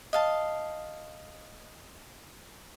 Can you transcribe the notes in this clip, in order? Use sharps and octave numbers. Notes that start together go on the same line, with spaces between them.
D#5 F5 A5